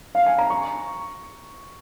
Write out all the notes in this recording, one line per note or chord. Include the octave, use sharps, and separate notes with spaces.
F5
G#5
A#5
C#6